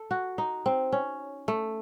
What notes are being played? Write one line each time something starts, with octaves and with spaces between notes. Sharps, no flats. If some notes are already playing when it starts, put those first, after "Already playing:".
Already playing: A4
F#4
D#4
C4
C#4
A3